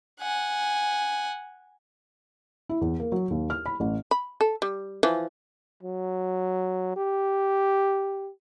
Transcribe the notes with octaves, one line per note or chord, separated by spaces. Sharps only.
F#5 G#5
E4
E2
A#3
F#3
D#2
F6
B5
A1
B5
A4
G3
E3 F3
F#3
G4